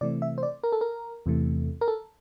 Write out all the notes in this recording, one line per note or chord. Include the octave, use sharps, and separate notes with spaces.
C3 E3 A3 C4 D5
E5
C5
D5
A#4
A4
A#4
E2 C3 E3 A3
A#4
A4